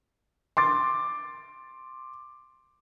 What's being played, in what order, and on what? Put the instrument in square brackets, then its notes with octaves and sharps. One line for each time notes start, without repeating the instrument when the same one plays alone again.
[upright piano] C6 D6 A6